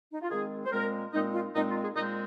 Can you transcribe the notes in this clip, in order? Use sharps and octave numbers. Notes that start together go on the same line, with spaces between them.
D#4
F4
D#3 G#3 C4 G#4
C5
A#2 G#3 C4 A#4
A#2 G#3 C4 D#4
F4
A#2 G#3 C4 D#4
F4
G#4
A#2 G#3 C4 D#4